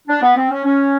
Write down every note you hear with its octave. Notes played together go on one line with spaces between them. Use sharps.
D4
B3
C4
C#4
C#4